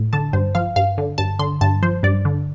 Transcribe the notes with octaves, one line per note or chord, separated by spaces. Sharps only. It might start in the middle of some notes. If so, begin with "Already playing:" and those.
Already playing: A2
D3 A5
G2 C5
F3 F5
G2 F5
D3
G2 A5
D3 C6
G2 A5
F3 C5
G2 D5
D3